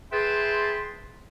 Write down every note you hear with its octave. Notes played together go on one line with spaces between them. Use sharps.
G#4 B4 E5 G5 A5 C6